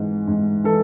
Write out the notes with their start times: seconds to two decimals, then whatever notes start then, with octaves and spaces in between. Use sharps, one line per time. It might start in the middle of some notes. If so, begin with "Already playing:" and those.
Already playing: G#2 E3
0.28 G#2
0.64 E3 A4